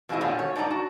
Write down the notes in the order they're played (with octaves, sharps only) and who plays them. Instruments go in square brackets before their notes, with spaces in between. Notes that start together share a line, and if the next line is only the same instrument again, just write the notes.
[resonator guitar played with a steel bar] F2 B2 E3 G#3 E4 D#5
A#2 D3 G3 C#4
F#4 C#5
G#2 D4 D#4 A4 D5 A#5
F#4